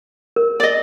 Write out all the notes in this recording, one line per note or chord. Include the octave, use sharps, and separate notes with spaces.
A#4
D5 D#5